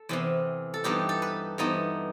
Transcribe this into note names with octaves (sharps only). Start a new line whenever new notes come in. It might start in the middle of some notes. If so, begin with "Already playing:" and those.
Already playing: A4
E2 C3 E3
A4
G2 E3 B3 D#4 G4
A4
B4
G2 E3 B3 D#4